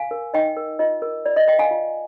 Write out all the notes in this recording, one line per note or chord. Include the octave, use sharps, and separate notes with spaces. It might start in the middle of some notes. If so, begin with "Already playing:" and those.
Already playing: F5 G#5
A#4
D#4 D#5 G5
A#4
F4 D#5
A#4
F4 D5
D#5
A#4 D#5 G5
F5 G#5
F4